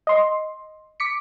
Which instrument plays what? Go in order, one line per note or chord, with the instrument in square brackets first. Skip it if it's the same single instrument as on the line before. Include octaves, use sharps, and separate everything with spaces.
[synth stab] D#5 C6
D6 B6 C#7